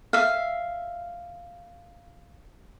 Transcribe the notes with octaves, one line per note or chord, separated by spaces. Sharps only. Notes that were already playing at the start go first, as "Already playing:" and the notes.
E5 F5